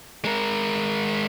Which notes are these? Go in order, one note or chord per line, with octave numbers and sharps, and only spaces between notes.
G#3 A#4